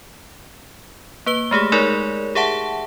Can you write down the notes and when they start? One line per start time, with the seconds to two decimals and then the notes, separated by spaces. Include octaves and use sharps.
1.26 A#3 B4 G7
1.51 G#3 A3 G4 G#4
1.72 G#3 D#4 G#4 A#4 C#5 D5
2.35 G4 G#4 E5 F#5 A5